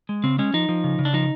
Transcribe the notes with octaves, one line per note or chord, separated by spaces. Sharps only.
G#3
C#3 C4
G#3 C#4
F3 D#4
F3
C#3
C#3
D4
F3 D#4